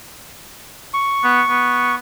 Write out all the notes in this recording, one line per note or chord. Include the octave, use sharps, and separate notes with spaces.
C#6
B3
B3